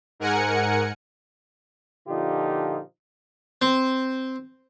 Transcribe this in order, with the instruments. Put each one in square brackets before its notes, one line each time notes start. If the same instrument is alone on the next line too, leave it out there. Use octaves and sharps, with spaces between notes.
[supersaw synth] G#2 A#4 F#5 G#5 C#7
[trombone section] A#2 D3 F3 D#4 F4 G4
[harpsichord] C4